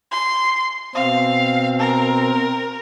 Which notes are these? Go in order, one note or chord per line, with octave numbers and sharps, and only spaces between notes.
C6
B2 C4 F5
A#4